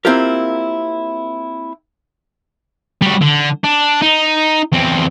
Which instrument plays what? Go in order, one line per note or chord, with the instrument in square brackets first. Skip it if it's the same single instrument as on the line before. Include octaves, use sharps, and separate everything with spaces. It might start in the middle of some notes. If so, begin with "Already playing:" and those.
[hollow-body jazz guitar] A#3 C4 E4 F4 G4 A#4
[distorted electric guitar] G3 F#4
D3
D4
D#4
E2 C4